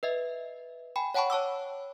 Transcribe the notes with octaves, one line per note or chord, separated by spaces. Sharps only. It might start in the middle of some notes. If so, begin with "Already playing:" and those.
B4 D#5 E5
G5 G#5 B5
C#5 F#5 G5 A5 B5 C#6
C#5 A5 D6 E6